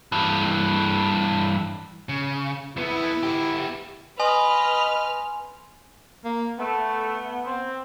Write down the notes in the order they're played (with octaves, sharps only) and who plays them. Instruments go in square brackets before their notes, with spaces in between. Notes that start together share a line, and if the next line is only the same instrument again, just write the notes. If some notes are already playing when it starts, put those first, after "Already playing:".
[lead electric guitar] G2 E3
C#3
[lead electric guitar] F2 B3 [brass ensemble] E4
[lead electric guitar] B3 G4
[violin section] B4 F6 [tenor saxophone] D#5 [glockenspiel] G#5 C6
[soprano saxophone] A#3
[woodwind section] A3 [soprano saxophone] B3
[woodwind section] C4